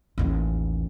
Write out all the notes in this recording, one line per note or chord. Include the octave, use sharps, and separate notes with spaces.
A1 D#2